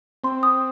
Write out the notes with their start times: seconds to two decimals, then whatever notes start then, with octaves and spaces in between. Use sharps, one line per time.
0.24 C4 C6
0.43 D#6